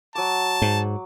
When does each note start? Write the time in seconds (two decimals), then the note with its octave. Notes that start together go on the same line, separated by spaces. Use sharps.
0.15 F#3 A5 D6
0.62 G#2